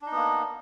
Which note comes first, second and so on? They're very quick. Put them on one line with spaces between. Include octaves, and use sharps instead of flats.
D4 D#4 B3 A#3